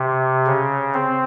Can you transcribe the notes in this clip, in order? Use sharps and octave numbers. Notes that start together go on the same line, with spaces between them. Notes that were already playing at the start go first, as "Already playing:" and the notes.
Already playing: C3
C#3
C4